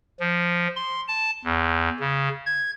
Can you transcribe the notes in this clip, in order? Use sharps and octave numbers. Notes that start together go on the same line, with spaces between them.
F3
C6
A5
E2
C#3
G#6